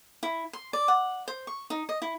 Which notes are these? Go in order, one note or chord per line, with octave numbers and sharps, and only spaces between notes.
E4
C6
D5
F#5
C5
C#6
D#4
D#5
E4